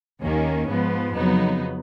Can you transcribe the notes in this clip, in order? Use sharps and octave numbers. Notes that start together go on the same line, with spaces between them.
D#2 D#3 A#3 C#4
G#2 F3 B3
F2 C#3 F#3 B3 D#4